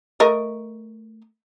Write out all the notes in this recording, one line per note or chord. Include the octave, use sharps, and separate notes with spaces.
A3 A#4 D#5